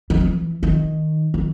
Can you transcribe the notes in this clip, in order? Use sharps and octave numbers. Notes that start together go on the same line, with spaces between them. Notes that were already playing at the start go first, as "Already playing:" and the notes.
D#3
E3
D#3
D#3